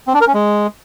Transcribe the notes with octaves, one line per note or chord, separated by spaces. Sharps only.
C4
D4
A#4
C#4
G#3